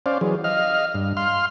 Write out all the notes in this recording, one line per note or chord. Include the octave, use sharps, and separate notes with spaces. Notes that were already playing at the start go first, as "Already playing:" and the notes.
C#4 C5 D5 F5
E3 F#3 G#4
D#5 F5 F6
G2
F5 C6 F6